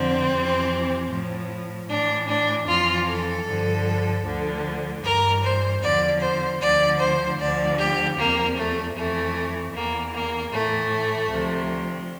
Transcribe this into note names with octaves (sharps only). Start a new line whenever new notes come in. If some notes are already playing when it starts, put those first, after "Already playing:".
Already playing: F2 D3 F3 C4
F2 C3 E3
A2 F3
A2 E3 D4
D4
F2 E3 F4
A4
G2 D3 F3
D2 D3 F3
G2 E3 A#4
C5
E2 D3 F3 D5
C5
D2 D3 F3 D5
C5
D2 D3 F3 D5
G4
E2 C3 F3 A#3
A3
F2 E3 A3
E2 E3 A#3
A#3
A2 E3 A3
D2 C3 F3